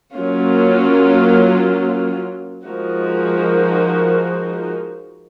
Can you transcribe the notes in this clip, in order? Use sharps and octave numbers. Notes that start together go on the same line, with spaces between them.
F#3 A#3 C#4 F4
F3 G#3 D#4 F#4 A#4